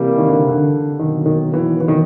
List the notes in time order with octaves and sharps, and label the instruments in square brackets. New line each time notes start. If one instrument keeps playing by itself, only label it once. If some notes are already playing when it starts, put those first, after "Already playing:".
Already playing: [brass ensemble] C3 E3 G3 A#3
[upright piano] D#3
D3
D3
[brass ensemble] B2 F#3 A#3 [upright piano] D#3
[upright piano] D#3
E3
E3
D#3